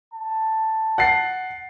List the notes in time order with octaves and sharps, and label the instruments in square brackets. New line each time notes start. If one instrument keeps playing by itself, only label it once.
[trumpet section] A5
[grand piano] F#5 A6 C7